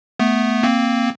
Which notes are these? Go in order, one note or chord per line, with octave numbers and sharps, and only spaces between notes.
A3 B3
A#3 C4